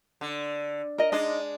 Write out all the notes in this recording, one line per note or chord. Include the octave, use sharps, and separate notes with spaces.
D3
A#4 D#5
G#3 D4 D#4 D#5